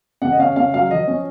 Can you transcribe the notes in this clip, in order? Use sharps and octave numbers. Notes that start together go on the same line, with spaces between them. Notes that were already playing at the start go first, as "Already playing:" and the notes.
C#3 F#5
D#5
C#4 F5
C#3 F5
F#3 F5
F3 D#5
C#4